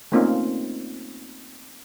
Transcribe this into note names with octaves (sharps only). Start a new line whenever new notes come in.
A3 A#3 C4 C#4 D#4 F4